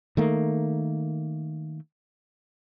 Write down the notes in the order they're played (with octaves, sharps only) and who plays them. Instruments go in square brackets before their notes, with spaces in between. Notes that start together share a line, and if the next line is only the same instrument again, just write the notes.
[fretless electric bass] D#3 A3 A#3